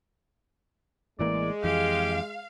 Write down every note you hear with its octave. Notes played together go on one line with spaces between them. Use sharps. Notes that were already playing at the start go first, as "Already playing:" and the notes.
A1 E3 G#3 A#3 D5
F2 E3 G4 F5